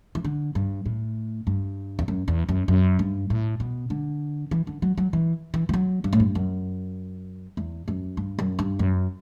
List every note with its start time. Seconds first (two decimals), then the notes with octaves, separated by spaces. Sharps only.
0.15 E3
0.25 D3
0.55 G2
0.86 A2
1.47 G2
1.99 E2
2.08 F#2
2.28 E2
2.49 F#2
2.68 F#2
2.99 G2
3.30 A2
3.60 B2
3.90 D3
4.51 E3
4.67 D3
4.82 F#3
4.97 F#3
5.13 E3
5.54 E3
5.69 E3
5.74 F#3
6.04 G2
6.13 A2
6.20 G2
6.35 F#2
7.57 E2
7.88 F#2
8.17 G2
8.39 F#2
8.59 G2
8.79 F#2